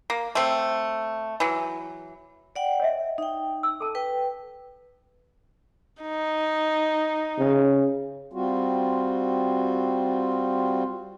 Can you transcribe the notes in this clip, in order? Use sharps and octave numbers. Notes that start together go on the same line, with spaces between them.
A#3
A3 C4
E3 F#3
D5 F#5 G5
C#5 D#5 E5
D#4 G5
E6
A4 A5
B4 G5
D#4
C#3
G3 C4 F4 F#4